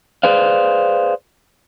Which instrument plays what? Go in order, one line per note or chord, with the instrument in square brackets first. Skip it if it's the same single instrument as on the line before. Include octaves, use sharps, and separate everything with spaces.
[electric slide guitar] G#4 B4 C5 D5 F5